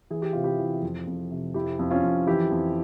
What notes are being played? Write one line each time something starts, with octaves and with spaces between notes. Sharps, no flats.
E3 G#4
G4
C3 F4
E4 G4
E3
F2
F2
C3
F2 E4 G4
F2
C#4 F4
F2
E3 E4 G4
F2